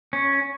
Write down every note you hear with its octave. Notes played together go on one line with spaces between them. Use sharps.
C#4